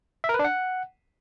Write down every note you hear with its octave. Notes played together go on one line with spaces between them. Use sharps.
E5
A#4
B4
D4
F#5